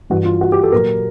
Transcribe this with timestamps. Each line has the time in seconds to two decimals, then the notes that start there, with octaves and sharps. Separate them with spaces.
0.10 G2 E3 F#4
0.25 F4
0.41 F#4
0.52 G4
0.63 A4
0.72 A#2 F#3 A#4